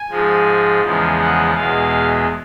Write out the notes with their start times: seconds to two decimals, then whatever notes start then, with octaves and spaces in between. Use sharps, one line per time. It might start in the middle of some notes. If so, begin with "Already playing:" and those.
Already playing: G#5
0.10 G#2 F3 G#3
0.83 E2 C#3 F3 G#3
1.20 F#5
1.55 E2 B2 G#3 F5